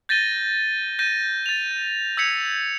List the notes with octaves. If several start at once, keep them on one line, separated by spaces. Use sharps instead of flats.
G6 A6 A#6 D#7 G7
G6 A#6 D#7
A6 F7
E6 G#6 B6 C#7 F7